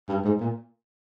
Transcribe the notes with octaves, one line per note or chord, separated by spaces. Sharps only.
G2
G#2
A#2